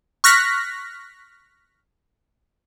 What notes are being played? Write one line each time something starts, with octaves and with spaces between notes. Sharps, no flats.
C#6 F6 F#6 A#6 B6